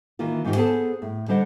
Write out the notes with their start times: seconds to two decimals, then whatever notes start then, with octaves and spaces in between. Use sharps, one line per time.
0.19 D#3 E3 A#3 F4
0.45 G#2 D#3 D4 D#4 F4 G4
0.56 B3 G#4 A4 C5 G#5 A5
1.02 A2
1.28 D3 G3 D4 C5 D#5 F#5